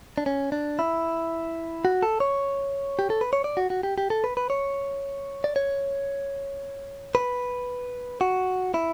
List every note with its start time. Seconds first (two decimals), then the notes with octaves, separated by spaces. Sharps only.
0.18 D4
0.26 C#4
0.52 D4
0.79 E4
1.85 F#4
2.03 A4
2.20 C#5
2.99 G4
3.10 A4
3.21 B4
3.33 C#5
3.44 D5
3.57 F#4
3.70 F#4
3.83 G4
3.98 G4
4.10 A4
4.24 B4
4.37 B4
4.50 C#5
5.44 D5
5.56 C#5
7.15 B4
8.21 F#4
8.74 E4